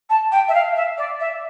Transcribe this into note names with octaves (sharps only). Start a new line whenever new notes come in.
A5
G5
E5
F5
E5
D5
E5